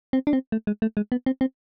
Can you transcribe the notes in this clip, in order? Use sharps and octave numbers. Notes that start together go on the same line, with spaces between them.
C4
D4
C4
A3
G#3
A3
G#3
B3
C4
C4